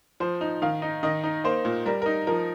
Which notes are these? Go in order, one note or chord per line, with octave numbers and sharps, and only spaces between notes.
F3 C5
D#4
D#3 F5
D#4
D#3 D#5
D#4
A#3 C5
A#2
G3 A#4
D#4 A#4
F3 A#4